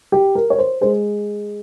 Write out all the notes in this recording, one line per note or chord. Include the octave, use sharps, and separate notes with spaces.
G4
A#4
C#5
C5
G#3 C5